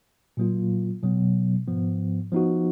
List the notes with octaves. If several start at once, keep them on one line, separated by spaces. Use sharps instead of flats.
A#2 F#3 A#3 F4
B2 F#3 B3
G#2 F3 B3
F3 B3 D#4 F#4